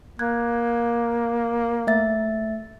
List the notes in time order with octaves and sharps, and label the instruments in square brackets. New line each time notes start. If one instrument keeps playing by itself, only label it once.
[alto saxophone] A#3 [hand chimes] F#6 G#6
[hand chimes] A3 E5 A6